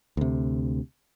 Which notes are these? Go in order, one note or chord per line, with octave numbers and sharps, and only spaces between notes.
D2 C3